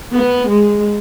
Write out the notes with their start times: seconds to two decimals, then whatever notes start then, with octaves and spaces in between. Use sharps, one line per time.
0.14 B3
0.51 G#3